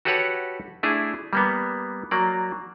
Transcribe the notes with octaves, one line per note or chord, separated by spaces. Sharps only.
F#4 G4 A4 B4 C#5 F#5
A3 D4 E4 G#4
G3 A#3 B3
F#3 A#3 D5